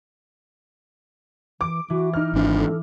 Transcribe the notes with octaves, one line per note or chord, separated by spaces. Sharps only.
E3 D6 D7
E3 F#4
D#4 E4 F6
G#1 D4
A4